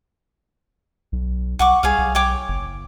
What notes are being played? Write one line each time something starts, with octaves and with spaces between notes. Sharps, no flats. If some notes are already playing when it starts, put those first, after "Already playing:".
B1
B1 F#5 C#6 D6
C2 G#4 C#5 F5
B1
C#5 G5 D6
F#1